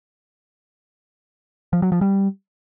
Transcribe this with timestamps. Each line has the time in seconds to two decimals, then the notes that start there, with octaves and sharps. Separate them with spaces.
1.73 F3
1.82 F#3
1.92 F3
2.01 G3